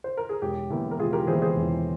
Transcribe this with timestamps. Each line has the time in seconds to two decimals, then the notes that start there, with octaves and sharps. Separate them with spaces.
0.04 C5
0.17 A#4
0.29 G#4
0.42 E1 G4
0.70 E2 E3 A#3
0.91 A#4
0.99 E1 F4 G#4
1.13 G4 A#4
1.27 E2 E3 A#3 G#4 C5
1.42 G#4 C5
1.56 E1